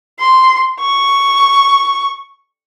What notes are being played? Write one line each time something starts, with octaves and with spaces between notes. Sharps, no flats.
C6
C#6